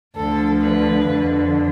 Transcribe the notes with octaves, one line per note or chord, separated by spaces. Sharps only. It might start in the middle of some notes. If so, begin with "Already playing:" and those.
D2 D3 F3 A4
B4
F2 D3 F3